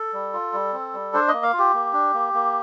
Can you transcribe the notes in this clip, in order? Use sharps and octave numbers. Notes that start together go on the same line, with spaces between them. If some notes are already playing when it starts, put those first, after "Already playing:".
Already playing: A4
G3
F4
G3
C4
G3
D4 C5
D#5
A#3
F5
F4
G4
A#3
D4
A#3
A#3